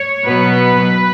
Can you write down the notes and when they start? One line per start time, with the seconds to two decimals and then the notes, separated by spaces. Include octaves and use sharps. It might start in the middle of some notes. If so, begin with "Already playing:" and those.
Already playing: C#5
0.25 B2 F#3 B3 B4